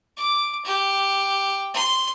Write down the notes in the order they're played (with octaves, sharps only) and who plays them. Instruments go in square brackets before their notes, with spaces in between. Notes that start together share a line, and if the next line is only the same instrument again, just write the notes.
[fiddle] D6
G4
C6